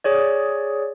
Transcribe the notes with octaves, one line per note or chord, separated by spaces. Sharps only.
G#4 C#5 D5